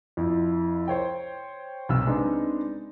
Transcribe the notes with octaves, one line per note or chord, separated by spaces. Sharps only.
F2 E4
C5 C#5 G5
B1 C3 E6
G#3 B3 C4 D4 D#4